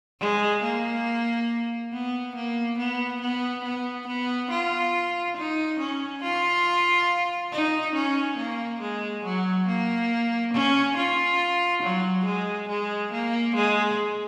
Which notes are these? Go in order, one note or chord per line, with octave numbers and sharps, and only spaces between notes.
G#3
A#3
B3
A#3
B3
B3
B3
B3
F4
D#4
C#4
F4
D#4
C#4
A#3
G#3
F#3
A#3
C#4
F4
F#3
G#3
G#3
A#3
G#3